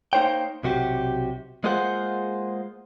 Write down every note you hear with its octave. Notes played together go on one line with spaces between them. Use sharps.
A#3 D#4 C5 C#5 G5
B1 C3 F#4 G4
G#3 A#3 F4 G#4 C5 F#5